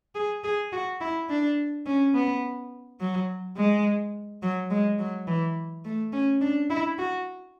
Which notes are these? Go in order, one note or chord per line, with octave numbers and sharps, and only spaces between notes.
G#4
G#4
F#4
E4
D4
C#4
B3
F#3
G#3
F#3
G#3
F#3
E3
A3
C#4
D4
E4
F#4